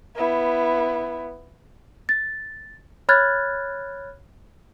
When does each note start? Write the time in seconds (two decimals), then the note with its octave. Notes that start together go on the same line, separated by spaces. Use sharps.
0.16 B3 E4
2.09 A6
3.09 C#5 B5 F6 F#6 G#6 A6